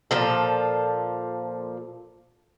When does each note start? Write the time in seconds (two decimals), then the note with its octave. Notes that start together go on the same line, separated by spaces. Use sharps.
0.11 A#2 F3 A4